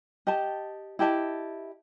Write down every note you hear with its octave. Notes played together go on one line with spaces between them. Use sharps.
G4 D#5 A5
E4 G4 D#5 A5